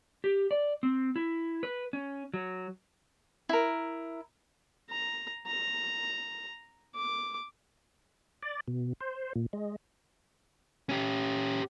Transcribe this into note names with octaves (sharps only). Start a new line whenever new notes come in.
G4
D5
C4
E4
B4
C#4
F#3
E4 A#4
A#5
A#5
D6
D5
B2
C5
A#2
G#3
C#4 G4